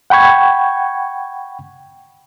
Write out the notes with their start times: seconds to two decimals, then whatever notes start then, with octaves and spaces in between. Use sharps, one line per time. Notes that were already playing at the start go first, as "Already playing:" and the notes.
0.10 F#5 G5 B5 C#6 G#6